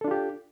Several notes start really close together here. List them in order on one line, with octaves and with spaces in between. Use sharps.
A4 D4 F4 G4